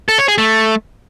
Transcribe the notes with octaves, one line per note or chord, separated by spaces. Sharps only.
A4
C#5
G#4
A3